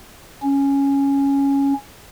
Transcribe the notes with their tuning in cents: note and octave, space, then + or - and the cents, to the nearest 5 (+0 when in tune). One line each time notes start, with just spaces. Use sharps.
C#4 +0